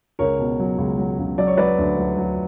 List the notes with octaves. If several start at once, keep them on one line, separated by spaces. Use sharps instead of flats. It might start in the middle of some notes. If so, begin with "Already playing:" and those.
C#2 A#4 C#5
B2
F#3
C#2
F#3
C#2
F#3 D5
C#5
F#3 B4 D5
D2
F#3
F#3